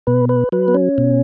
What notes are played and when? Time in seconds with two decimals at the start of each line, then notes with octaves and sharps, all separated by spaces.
0.07 B2 B4
0.29 B4
0.52 F#3 B4
0.68 B3
0.74 C#4
0.98 B2